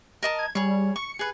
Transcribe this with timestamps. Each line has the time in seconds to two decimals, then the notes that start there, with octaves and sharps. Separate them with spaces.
0.23 A#4 D#5 A5
0.39 G#6
0.55 G3 G#4 C#5
0.96 C#6 C#7
1.19 G#4 B4